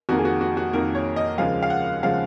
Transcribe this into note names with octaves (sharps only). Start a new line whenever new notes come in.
F2 D#3 A#3 F#4
G#4
F#4
F#4
F#4
F2 D#3 A#3 A#4
C#5
D#5
D#2 C#3 F3 G#3 F5
F5
F#5
C#3 F3 G#3 F5